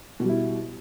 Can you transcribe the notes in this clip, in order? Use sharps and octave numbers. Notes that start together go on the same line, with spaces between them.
B2 G3 E4